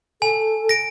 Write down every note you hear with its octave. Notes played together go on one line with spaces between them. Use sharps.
A4 G#5
A#6 D7